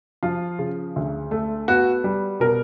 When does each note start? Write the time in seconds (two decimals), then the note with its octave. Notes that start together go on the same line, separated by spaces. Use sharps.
0.23 F3 F4
0.59 C#3
0.96 D2
1.31 A3
1.68 B3 F#4
2.04 G3
2.40 B2 A#4